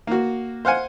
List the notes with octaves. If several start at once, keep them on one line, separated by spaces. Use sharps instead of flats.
A#3 F#4
C5 F5 F#5 G#5